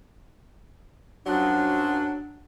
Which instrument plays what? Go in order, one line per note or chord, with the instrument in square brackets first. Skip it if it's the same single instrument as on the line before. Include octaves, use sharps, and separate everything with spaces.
[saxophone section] F#2 F3 F#3 [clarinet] D4